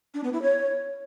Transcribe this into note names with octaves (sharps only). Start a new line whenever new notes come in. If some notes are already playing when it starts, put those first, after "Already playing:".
D4
B3
E4
C#5